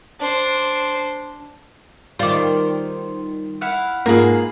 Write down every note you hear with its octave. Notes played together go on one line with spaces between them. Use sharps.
D4 C5
D#3 G3 F4 C5 D6
E4 F5 F#5
G#2 A#3 F4 G#4 A#4 B4